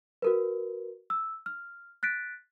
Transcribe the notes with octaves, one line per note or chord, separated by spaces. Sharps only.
F#4 A#4 B4
E6
F6
F#6 A6 B6 D7